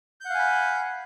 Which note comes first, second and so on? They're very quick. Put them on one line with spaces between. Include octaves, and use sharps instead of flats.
G6 F#5 F5 G#5 B5